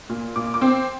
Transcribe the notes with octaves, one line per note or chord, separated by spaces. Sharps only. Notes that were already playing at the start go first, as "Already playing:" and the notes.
A#2
A#2 D6
D6
C4